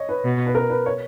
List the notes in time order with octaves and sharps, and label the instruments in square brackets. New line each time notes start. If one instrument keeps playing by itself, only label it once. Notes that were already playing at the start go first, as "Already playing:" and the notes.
Already playing: [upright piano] C#5 D#5
B4
[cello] B2
[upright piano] B4
A#4
B4
C#5